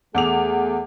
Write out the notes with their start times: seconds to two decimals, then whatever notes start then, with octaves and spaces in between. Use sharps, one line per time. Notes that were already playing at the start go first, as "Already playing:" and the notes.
0.15 E2 A3 G#4 D6 F7